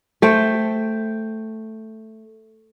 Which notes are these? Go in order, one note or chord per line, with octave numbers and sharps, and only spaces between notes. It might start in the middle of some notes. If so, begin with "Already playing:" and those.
A3 C5 G5